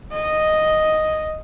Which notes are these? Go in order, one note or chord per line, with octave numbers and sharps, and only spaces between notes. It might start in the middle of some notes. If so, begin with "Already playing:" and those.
D#5